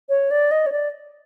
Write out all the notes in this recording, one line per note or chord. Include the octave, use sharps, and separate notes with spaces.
C#5
D5
D#5
C#5
D5